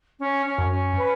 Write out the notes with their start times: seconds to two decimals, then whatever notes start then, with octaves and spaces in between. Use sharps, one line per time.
0.19 C#4
0.46 C#4
0.58 F#2
0.71 C#4
0.97 B4